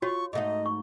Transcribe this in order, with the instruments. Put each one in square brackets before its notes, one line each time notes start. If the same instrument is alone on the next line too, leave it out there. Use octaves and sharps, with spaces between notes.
[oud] F4 [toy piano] F#4 C#5 [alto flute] C#6
[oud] G#2 A3 D#4 [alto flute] D#5
[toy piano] C#6